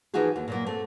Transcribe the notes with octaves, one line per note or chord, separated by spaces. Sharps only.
E3 F3 D#4 F4 F#4 G#4
D#2
A#2 F#3 A#3
A3 C4